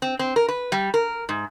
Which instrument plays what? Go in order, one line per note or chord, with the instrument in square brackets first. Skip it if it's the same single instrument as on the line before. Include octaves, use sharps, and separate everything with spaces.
[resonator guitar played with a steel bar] C4
C4
A#4
B4
G3
A#4
G#2